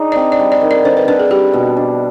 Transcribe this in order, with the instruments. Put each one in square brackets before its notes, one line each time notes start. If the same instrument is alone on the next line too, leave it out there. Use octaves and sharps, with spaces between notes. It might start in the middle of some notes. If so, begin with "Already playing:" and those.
Already playing: [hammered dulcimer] D4 D#4 G#4
[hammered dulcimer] C4 [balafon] D5
[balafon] D5
[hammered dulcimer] G3
[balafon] D5
[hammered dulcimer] D#3
[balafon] D5
[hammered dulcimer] D3 [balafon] C5
[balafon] B4
[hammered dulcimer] D3 [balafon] B4
[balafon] G#4
[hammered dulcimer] G3 [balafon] G4
[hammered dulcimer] B2
D4